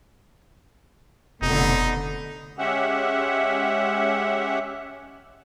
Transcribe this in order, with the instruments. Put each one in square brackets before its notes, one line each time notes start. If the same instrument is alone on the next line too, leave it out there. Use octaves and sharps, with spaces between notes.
[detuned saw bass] F1 [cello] B2 D3 [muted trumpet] D#4
[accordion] G#3 C#4 G4 E5 F#5